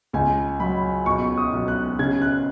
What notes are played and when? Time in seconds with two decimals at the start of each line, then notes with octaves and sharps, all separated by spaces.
0.13 C#2 G#5
0.60 F#3 B5
1.06 B1 C#6
1.37 D#6
1.53 B1
1.68 F#6
1.99 C#3 G#6
2.22 F#6